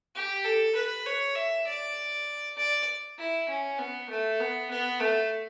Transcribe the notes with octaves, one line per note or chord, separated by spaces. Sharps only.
G4
A4
B4
C#5
E5
D5
D5
E4
C#4
B3
A3
B3
B3
A3